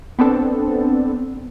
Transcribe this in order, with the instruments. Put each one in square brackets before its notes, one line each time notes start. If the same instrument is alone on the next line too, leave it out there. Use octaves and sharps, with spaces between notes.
[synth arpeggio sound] B3 C4 D4 A4